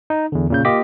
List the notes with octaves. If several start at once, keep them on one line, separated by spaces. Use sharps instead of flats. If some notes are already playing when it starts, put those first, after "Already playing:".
D#4
E2 D3
A#2 C#3 G6
A#3 F4 G4 D#5 D6 B6